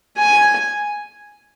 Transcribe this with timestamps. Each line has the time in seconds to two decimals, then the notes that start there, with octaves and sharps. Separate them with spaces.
0.18 G#5